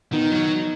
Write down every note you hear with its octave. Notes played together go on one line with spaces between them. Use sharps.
D#3 B3 D#4
F#3